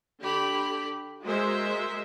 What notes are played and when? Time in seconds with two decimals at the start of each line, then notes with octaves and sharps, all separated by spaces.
0.20 D3 G4 B5
1.24 G#3 F#4 A#4 C5 E5